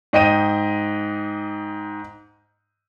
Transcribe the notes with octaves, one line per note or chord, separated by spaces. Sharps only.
G#2 D#5 G5 D#7